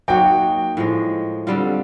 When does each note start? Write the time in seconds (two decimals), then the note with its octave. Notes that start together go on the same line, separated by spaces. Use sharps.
0.08 F#3 A#3 D#4 F#4 G5
0.77 A2 F3 G#3
1.47 D3 G3 C4 F4